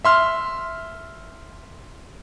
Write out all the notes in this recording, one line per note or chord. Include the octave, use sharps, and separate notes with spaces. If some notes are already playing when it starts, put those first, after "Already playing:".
E5 C6 F6